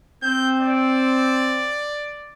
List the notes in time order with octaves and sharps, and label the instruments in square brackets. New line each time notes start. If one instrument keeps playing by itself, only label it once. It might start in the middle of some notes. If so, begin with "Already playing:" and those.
[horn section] C4 [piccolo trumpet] G6
[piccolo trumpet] D5